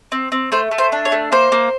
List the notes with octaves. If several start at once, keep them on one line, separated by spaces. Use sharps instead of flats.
C4
C4
A3 C5
A3
C5
D4
C#5
A3
A#3 C5
A#3